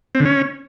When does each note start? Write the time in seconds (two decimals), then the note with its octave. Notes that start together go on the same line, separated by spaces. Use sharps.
0.15 C4
0.20 D3
0.25 C#4